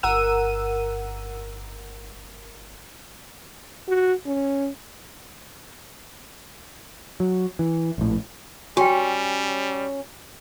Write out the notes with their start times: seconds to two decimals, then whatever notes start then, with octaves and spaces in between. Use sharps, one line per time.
0.03 G1 A#4 F#5 E6 D#7
3.88 F#4
4.26 C#4
7.20 F#3
7.59 E3
7.98 A#1 A2
8.77 G3 C#4 F#4 G5